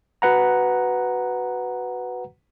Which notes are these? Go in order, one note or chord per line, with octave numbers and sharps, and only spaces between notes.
F#4 B4 F#5 A#5